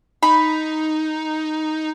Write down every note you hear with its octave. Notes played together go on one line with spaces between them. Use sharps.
D#4 B5